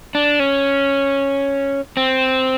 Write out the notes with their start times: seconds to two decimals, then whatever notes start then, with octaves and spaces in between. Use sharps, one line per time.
0.15 D4
0.40 C#4
1.97 C4